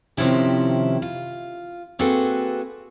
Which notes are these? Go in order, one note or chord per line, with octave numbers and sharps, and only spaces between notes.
C3 D#3 F3 C#4 E4 G4
F4
A#3 C4 F#4 G#4 A4 B4